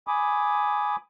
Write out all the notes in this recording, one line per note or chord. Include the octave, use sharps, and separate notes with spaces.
G#5 B5 D6 D#6